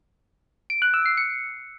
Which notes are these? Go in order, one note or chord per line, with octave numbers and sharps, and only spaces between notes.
D7
F#6
E6
C7
C#7